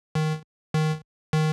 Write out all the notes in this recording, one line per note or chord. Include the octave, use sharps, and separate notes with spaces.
D#3
D#3
D#3